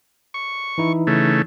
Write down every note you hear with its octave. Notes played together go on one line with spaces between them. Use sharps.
C#6
E3 D#4 E4
C#3 A3